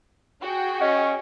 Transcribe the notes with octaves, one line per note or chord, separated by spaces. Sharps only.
F#4 G#4 G5
C#4 D#5